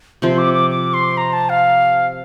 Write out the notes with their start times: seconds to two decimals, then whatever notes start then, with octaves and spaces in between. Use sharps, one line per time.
0.22 C3 F3 C4 C6
0.38 D6
0.54 D6
0.70 D6
0.94 C6
1.17 A#5
1.33 A5
1.49 F5